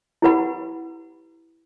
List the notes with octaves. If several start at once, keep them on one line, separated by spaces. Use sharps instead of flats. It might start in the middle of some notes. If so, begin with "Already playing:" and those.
E4 G4 B4 F#5 B5